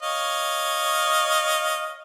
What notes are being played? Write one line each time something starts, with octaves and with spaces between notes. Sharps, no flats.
C#5 D#5 F5